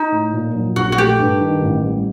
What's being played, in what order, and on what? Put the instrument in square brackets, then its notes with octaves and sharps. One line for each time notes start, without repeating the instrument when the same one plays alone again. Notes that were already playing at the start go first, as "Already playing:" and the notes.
Already playing: [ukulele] D#4
[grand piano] A2
A#2
F#3
[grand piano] A#1 [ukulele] F#4
[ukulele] F#4
[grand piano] A3 [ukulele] G4
[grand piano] G2
D#3
A1
G3